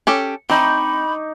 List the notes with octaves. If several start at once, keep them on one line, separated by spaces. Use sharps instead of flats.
C#4 G4 A4
C4 D#4 B5 C#6 D6